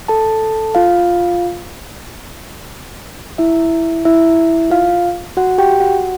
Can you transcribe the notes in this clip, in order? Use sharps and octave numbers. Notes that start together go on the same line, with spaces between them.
A4 A5
F4 F5
E4 E5
E4 E5
F4 F5
F#4 F#5
G4 G5
F#4 F#5